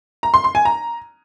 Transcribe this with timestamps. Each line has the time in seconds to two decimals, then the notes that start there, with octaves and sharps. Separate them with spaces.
0.23 A#5
0.34 C6
0.44 C6
0.55 G#5
0.65 A#5